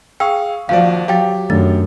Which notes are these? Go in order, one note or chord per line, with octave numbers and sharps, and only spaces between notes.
G#4 F5 G5 C#6 E6
D#2 F3 F#4 D5 F5
F#3 G4 F5 G5 A6
F#2 D#3 A3 D4 A6